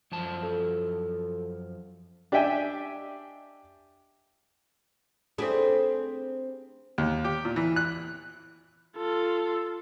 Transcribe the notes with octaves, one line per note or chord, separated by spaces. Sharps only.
F#2 F3 A5
A4
D4 G4 D#5 E5 G5 G#5
A3 C4 D4 E4 G4 G#4
D#2
G4
A#2
E3
F#6
F4 A4